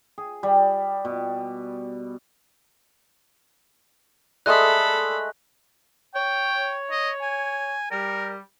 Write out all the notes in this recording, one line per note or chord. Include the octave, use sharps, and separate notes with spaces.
G#4
G3
B2
G#3 A3 A4 A#4 D5 B5 D#6 F#6
C#5 G5
D#5
G#5
G3 A#4